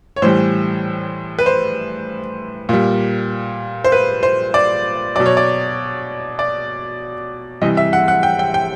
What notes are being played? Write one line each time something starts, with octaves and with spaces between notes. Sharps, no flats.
C#5
A2 E3 G3 C5
B4
C5
A#2 G3
C5
B4
C5
D5
B2 F#3 D5
C#5
D5
D5
C3 E3 G3 D#5
E5
F#5
F#5
G5
G5
G5